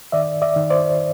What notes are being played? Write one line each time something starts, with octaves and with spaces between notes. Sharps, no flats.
D#3 D5 E5
D5 E5
D#3
C5 D5